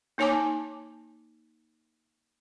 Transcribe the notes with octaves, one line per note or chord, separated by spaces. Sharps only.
A#3 D#4 C#5 G#5 A5 D6